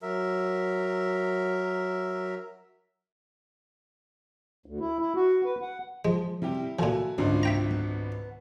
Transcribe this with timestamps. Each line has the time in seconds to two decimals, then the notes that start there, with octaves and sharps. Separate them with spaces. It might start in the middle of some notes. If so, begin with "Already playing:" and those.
0.02 F#3 A#4 E5
4.66 D2
4.80 E4
4.99 E4
5.16 F#4
5.45 B4
5.62 F#5
6.05 F3 G#3
6.42 C3 G3 E4 G4
6.79 A#2 F3 F#4 A4 G#5
7.18 G#1 C#2 D3 F4
7.43 E5 G5 A#5
7.71 B3